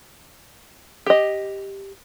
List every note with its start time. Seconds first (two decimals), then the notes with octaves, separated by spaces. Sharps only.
1.06 G4 D#5